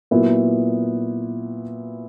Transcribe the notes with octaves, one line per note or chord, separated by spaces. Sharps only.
A#2 F#3 B3 E4